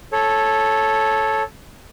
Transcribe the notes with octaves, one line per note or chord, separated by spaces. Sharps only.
A4 C#5